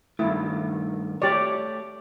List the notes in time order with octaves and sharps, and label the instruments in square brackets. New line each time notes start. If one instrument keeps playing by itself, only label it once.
[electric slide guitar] G2 D#3 A3 [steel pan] E4
[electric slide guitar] A3 C#5 [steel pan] G4 D5